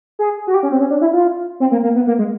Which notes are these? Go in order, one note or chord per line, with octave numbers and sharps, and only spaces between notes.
G#4
F#4
G4
C#4
C4
C#4
D4
E4
F4
C4
A#3
A#3
B3
A#3
G#3